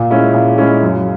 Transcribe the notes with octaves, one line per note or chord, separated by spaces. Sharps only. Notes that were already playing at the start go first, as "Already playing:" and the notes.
Already playing: A#2
G#3 C#4 E4
A#2
G#3 C#4 E4
F#2